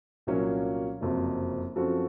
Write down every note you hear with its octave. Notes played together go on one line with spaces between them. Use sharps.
C2 A#2 F#3 A#3 C#4
F#1 F2 C3 F#3 C4
F#2 F3 C4 F#4 A4